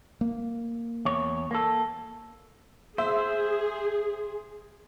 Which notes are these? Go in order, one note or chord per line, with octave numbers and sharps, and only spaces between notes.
A#3
E2 C#5
A#3 A4
G#4 C5 E5